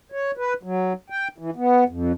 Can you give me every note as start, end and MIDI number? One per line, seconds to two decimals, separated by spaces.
0.12 0.31 73
0.37 0.54 71
0.63 0.93 54
1.10 1.28 79
1.38 1.50 52
1.56 1.84 59
1.89 2.12 41